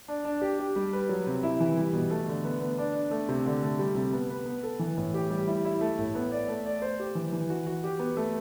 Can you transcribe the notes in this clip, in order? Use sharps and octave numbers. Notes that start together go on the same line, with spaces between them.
D4
D4
G4
G4
G3
B4
F#3
C3
E4
E3
G3
B2
A3
D3
B3
B3
D4
D4
A3
C3
D3
A3
G3
C3
B3
B4
B3
A4
E3
A2
G4
G3
E4
E4
A3
A2
B3
D5
A3
D5
C5
G4
E3
E3
F#4
F#4
G4
B3
A3